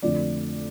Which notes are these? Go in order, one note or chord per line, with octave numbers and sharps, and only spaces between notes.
F2 D3 F3 A3 D5